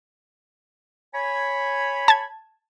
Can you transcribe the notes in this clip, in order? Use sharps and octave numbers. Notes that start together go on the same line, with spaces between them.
C#5 G#5 B5
A5 G#6